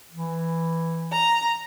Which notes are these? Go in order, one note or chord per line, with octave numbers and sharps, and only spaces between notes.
E3
A#5